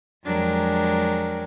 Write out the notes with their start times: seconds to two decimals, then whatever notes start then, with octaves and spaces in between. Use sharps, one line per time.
0.25 F2 F#3 G#3 D4 G4 A#4